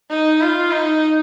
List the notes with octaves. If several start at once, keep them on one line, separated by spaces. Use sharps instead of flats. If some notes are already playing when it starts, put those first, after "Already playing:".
D#4
F4
D#4